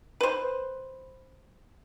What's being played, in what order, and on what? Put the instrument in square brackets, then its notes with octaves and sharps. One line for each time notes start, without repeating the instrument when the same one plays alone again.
[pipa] B4 C5